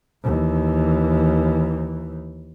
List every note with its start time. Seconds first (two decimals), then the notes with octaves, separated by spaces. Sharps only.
0.24 D#2 E3